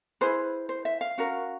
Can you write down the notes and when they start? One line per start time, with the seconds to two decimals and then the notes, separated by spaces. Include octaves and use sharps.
0.21 E4 G#4 B4 C5
0.69 C5
0.85 E5
1.01 F5
1.18 C#4 F#4 A#4